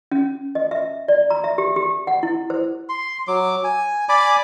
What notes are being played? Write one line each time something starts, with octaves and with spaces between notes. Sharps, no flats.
C#4
D#5
E5
D5
A#5
E5
G4
G4
F#5
E4
C5
C6
F#3 D6
G#5
D5 G#5 B5 D6